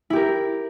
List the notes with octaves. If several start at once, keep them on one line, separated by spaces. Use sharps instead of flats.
E4 G4 A#4